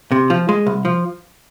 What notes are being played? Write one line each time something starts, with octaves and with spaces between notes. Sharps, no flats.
C3
F3
G#3
C2
F3